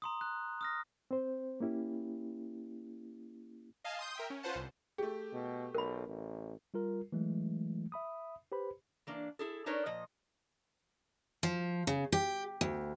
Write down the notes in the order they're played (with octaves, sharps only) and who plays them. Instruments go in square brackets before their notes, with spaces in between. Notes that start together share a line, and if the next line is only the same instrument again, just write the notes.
[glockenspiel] A#5 C6 D#6
F#6
D#6 F6 A#6
[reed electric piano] C4 C5
A#3 C#4 E4 G4
[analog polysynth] D#5 F5 G#5 A5
C6 D#6 G6
A#4 E5 G5
C#4
C#4 F4 B4 C5 F#5 A5
C2
[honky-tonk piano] A3 G4 [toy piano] G#4
[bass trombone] B2
[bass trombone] B1 [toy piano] A#4 B5
[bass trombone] A1
[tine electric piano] G3 F4 A#4
E3 F#3 G#3 A3
E5 B5 D#6
G4 B4 C5 B5
[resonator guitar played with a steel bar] E3 A#3 D4
E4 G#4 A4
D4 D#4 A#4 B4 C#5 D5
A#2 F3 D#5
[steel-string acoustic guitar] F3
C#3
G4
D2